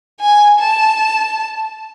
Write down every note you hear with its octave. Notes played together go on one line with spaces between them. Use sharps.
G#5
A5